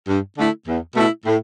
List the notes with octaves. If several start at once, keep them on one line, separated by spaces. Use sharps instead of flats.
G2
D3 A3 E4
E2
B2 A3 E4
A2